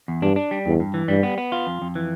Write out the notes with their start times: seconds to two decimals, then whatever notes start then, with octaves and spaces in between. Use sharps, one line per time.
0.08 E2
0.22 G2 D4
0.36 D4
0.51 G3
0.66 E2 G2
0.80 G2
0.94 E3
1.08 G2 G3
1.23 B3
1.38 B3
1.52 F4
1.67 F2
1.82 F2
1.95 E3